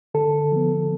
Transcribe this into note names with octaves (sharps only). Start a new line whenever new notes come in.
D3 A4
F3 B3